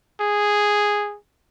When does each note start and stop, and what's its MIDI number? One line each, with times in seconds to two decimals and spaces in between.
0.21 1.16 68